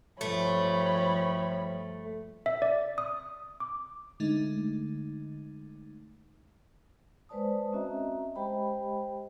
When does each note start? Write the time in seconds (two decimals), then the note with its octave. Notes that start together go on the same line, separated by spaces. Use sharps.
0.21 G2 F3 A3 C#5 B5
2.46 E5
2.62 D5
2.98 D#6
3.60 D6
4.20 D3 G#3 A3 D#4
7.29 G#3 B4 C5 D5 A5 D#6
7.73 C4 C#4 F#4 D#5 E5 A#5
8.36 G#3 G4 C5 D#5 G5 B5